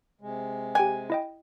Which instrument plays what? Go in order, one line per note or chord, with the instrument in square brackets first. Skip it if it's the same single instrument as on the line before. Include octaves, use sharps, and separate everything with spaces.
[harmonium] C3 G#3
[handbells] G4 G5 F#6 [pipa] G#5
[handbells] E4 D#5 G5